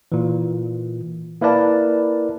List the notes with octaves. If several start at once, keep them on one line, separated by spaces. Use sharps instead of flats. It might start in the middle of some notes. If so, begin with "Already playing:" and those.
A#2 E3
A#3 E4 A#4 B4 D5 A5